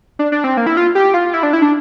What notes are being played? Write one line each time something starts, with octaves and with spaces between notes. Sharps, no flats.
D4
D4
C4
A#3
E4
F4
G4
F4
E4
D4
E4
D4